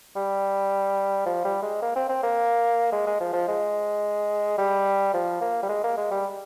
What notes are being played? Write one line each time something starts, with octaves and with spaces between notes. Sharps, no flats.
G3
F3
G3
G#3
A#3
C4
C4
A#3
G#3
G#3
F3
F3
G#3
G3
F3
A#3
G3
G#3
A#3
G#3
G3